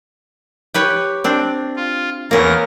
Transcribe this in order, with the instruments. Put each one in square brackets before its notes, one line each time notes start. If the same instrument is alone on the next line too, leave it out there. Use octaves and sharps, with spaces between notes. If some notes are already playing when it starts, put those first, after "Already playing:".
[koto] G4 B4 C#5
C4 D4
[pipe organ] F4
[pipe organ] E2 A#4 A#6 [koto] A#3 C#4